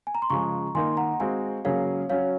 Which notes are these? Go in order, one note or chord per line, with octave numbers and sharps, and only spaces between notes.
G#5
A#5
C6
C#3 F3 G#3 A#5 C#6
D#3 A#3 D#4 G#5 C6
F#5 A#5
G#3 C4 F#4 F5 G#5
C#3 F#3 A#3 C#4 G#4 C#5 F5
F#3 C#4 F#4 C#5 F5